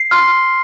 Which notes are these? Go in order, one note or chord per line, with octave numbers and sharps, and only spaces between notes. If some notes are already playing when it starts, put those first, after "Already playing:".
Already playing: C7
C6 F6